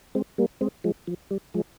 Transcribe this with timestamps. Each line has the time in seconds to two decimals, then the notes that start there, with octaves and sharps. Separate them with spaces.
0.15 G#3 C4
0.38 G3 A#3
0.61 G#3 C4
0.84 F3 G#3
1.07 F3
1.31 G3
1.54 F3 G#3